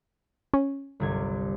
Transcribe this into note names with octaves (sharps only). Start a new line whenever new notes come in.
C#4
G1 C2 G#6